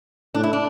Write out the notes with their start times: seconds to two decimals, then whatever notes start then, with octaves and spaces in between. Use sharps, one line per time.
0.35 A2 D4
0.43 E4
0.53 D4